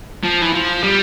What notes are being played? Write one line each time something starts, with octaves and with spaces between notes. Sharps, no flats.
F3
E3
F3
G3